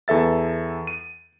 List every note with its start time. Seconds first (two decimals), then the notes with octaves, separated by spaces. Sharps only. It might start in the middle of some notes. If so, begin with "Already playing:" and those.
0.08 E2 A4 E5 A6
0.87 D#7